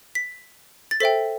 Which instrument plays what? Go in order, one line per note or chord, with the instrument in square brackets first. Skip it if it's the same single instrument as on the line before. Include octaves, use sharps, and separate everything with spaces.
[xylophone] B6
A6
A4 C5 E5 G5 B6